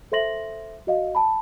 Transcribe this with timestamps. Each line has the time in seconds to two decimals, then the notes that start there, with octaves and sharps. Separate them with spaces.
0.12 A4 C5 E5 C6 A#6 F#7
0.87 F#4 D#5 F5
1.15 A5 B5